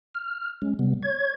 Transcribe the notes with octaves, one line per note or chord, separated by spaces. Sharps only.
F6
G#3 C#4
C3 G3 B3
C#5 G#6